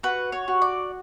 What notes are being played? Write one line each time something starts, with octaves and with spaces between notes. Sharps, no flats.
F#4 B4
C#5
F#4
D5